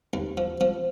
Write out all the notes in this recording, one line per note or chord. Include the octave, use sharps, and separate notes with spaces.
D#2
F3
F3